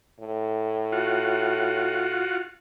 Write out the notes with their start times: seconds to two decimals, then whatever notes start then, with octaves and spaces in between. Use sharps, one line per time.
0.20 A2
0.92 F4 F#4 F#5